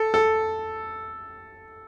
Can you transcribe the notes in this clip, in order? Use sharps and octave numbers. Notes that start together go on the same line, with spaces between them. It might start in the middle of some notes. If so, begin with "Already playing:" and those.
Already playing: A4
A4